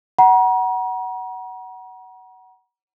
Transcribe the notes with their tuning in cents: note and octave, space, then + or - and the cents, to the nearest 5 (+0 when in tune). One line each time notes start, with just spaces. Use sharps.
F#5 +15 A#5 +40